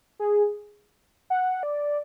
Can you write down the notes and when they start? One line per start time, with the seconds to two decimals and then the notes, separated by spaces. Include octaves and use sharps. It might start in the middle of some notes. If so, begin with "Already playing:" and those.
0.20 G#4
1.30 F#5
1.63 D5